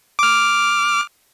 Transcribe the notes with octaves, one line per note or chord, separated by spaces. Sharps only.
D6 F6